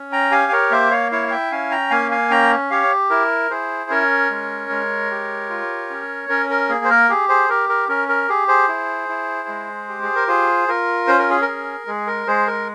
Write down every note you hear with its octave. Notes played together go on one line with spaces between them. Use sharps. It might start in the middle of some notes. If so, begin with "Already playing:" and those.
Already playing: C#4
G5 A#5
G4 F5 G#5
A#4 C#5
A#3 C5 E5
C#5 F5
E4 C#5 F5
F5
E5 G5
C#4 F5 G#5
G5 A#5
A#3 F5 G#5
F5 G#5
C#4 G5 A#5
G4 C#5 F5
E4 A#4
E4 G#4 C5
C#4 A#4 C#5
G#3
G#3
G4
F4
C#4
C#4 A#4
A#4
A#3 G#4
C5
A#4
G4 G#4
G#4 C5
G4 A#4
A#4
C#4 A#4
A#4
G4 G#4
G#4 C5
E4
E4
G#3
G4
G#4
A#4
F4 G#4 C5
F4 A#4
C#4 C5
A#4
G#4
A#4
G#4
G#3 G#4
A#4
G#3 G#4 C5
A#4